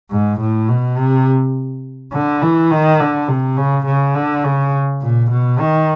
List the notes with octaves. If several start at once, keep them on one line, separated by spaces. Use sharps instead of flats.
G#2
A2
B2
C3
D3
E3
D#3
D3
C3
C#3
C#3
D3
C#3
A#2
B2
D#3